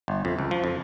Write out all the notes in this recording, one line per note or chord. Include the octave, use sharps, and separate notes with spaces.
G1
F2
C#2
F3
F2